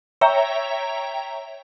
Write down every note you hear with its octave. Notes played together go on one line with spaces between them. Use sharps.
C#5 E5 G5 A#5